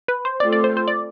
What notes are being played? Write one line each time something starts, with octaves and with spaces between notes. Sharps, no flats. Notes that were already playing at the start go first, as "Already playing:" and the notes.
B4
C5
A3 C4 F4 A4 D5
D5
C5
C5
D5